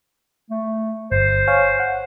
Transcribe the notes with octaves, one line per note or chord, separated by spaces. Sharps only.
A3
G1 C5
C#5 F5 G#5
F#5